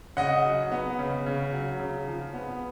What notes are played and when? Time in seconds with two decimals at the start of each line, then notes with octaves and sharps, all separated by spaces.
0.17 C#3 D#5 F#5
0.45 F#3
0.72 B3
0.99 C#3
1.26 C#3
1.53 F#3
1.80 C#3
2.08 F3
2.34 B3